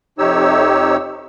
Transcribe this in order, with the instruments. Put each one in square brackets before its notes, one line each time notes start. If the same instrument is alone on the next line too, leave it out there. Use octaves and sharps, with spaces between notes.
[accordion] F2 C3 D#4 G4 C#5 E6